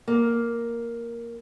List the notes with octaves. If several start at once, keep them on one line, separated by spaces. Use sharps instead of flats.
A#3